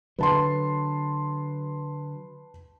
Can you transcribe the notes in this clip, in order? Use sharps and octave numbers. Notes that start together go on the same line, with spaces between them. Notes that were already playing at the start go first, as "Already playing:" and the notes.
D3 F#3 B4 A5 C6